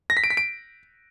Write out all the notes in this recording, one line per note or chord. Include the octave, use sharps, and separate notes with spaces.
A#6
B6
D7
B6
D7